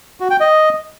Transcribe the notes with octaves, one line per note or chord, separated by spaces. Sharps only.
F#4
G5
D#5